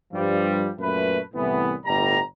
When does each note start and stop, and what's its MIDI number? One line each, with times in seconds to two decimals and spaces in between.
0.13 0.69 43
0.13 0.69 53
0.13 0.69 55
0.79 1.19 42
0.79 1.19 46
0.79 1.19 57
0.79 1.19 71
1.34 1.73 36
1.34 1.73 45
1.34 1.73 52
1.34 1.73 59
1.85 2.19 31
1.85 2.19 45
1.85 2.19 55
1.85 2.19 82